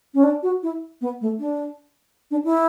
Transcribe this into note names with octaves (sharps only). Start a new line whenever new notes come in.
C#4
D4
F#4
E4
B3
A3
D4
D4
E4